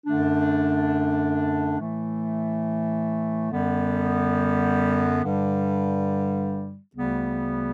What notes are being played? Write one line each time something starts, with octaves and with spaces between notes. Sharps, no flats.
F#2 D3 A3 D4
A2 E3 A3
F#2 D3 G3 B3
G2 D3 G3
D2 C#3 G3 B3